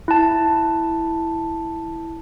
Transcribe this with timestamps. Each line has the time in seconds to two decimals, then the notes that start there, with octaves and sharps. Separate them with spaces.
0.08 E4 A5